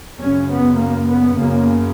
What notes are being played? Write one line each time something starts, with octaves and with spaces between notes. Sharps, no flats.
F#2 C#3 C#4
B3
A#3
B3
F#2 C#3 A#3